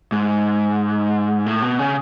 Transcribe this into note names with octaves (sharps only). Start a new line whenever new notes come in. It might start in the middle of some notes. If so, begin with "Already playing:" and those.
G#2
A2
B2
C#3